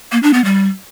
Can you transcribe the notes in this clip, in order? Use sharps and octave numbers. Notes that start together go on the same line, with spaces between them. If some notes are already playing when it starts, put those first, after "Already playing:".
A#3
D4
B3
G3